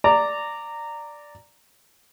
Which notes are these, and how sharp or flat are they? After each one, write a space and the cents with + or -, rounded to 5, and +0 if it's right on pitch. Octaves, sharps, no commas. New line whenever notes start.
D5 +0 A#5 -15